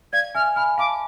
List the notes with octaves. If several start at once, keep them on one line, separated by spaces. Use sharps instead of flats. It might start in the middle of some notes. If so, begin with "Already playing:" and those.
D5 F5 G#6
E5 G#5 F6
G#5 B5 F6
F5 A5 D6